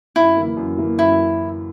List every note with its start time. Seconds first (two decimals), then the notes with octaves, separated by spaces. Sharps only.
0.16 F#2 E4
0.37 E3 A#3
0.57 F#2
0.77 E3 A#3
0.98 F#2 E4